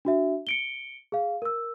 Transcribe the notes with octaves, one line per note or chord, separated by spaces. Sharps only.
D4 F#4 E5
C#7 D7 G7
G#4 F5
A#4 E6